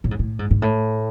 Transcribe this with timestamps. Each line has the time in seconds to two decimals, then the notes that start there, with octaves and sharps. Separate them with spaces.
0.04 A2
0.11 G#2
0.19 A2
0.39 G#2
0.51 G#2
0.62 A2